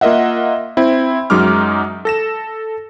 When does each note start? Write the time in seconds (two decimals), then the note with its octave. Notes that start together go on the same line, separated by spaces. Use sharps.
0.01 A#3 F4 A#4 D#5 E5 F#5
0.77 C4 E4
1.30 F#2 F#3 G#3 D#4 D6 F6
2.05 A4 A#6 E7